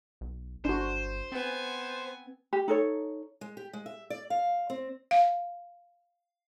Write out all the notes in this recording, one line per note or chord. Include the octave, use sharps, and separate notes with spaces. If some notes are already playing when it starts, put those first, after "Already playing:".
B1
G1 D4 F#4 C5
B3 C4 G#5
G4
D#4 A4 C#5
G#3
G4
G#3
E5
D5
F5
C4
F5